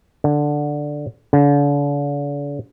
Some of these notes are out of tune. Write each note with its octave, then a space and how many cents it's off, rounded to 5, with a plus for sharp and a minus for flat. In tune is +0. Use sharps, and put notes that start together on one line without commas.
D3 +5
D3 -40